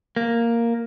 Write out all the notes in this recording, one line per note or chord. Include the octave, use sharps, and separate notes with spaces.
A#3